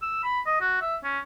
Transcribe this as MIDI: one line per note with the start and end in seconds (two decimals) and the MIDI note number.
0.02 0.22 88
0.23 0.41 83
0.46 0.60 75
0.61 0.77 66
0.82 0.96 76
1.04 1.20 61